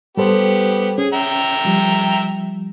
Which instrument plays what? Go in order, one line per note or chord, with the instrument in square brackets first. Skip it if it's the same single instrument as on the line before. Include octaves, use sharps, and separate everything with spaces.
[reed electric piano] G3 A4 C5 [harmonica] B3 G4
[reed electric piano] C#4 [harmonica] G#4
[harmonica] E5 G5 A#5
[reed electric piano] F3 G3